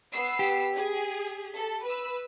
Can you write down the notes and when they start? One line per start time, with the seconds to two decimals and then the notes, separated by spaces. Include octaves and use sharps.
0.11 B3 E6 C7
0.39 G4
0.75 G#4
1.56 A4
1.84 B4 E6